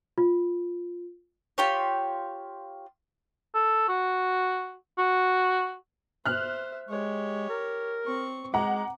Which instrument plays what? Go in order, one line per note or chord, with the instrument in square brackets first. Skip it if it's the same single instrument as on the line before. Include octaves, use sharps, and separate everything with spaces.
[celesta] F4
[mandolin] F4 G4 C#5
[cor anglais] A4
F#4
F#4
[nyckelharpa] C5 E5 [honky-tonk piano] F6 F#6
[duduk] G#3 [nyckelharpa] G4 C#5
[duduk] A#4
[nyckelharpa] C4 C#6
[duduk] G#3 [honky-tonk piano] F#5 A#5 [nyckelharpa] D6